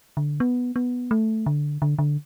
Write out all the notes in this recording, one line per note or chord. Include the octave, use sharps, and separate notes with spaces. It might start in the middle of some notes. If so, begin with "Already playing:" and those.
D3
B3
B3
A3
D3
D3
D3